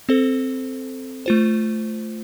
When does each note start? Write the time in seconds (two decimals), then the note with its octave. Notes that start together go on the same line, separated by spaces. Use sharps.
0.09 C4 A4 C5
1.26 A3 F4 C5